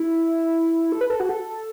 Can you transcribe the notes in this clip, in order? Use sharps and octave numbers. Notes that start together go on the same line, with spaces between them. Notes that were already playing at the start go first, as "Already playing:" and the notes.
Already playing: E4
A4
B4
A4
F#4
A4